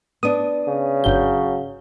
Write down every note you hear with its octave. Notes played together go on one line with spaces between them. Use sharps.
B3 D4 D#6
C#3
G1 F#3 G6